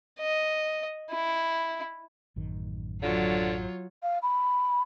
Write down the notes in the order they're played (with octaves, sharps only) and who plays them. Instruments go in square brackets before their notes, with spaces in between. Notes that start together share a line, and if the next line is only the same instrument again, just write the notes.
[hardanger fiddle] D#5
E4
[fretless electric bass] A1 F#2 D#3
[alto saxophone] D3 [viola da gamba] F#3 [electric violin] F4 C#5
[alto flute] F5
B5